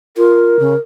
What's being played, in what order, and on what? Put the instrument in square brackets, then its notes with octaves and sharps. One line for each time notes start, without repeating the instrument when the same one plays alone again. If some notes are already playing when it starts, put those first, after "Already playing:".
[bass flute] F4 [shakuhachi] A#4
[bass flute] C#3